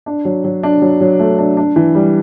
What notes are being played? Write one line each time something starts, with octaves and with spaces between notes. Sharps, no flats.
D4
F#3
F#3
D4
F#3
F#3
A3
D4
D4
E3
G3